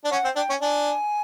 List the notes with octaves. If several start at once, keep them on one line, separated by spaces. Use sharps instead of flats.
D4
C#4 F#5
C4
D4 G5
C#4
D4 G#5